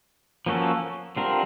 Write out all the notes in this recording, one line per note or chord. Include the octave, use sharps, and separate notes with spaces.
F3 A#3 C#4 F#4 A4
D3 G3 C4 F4 A#4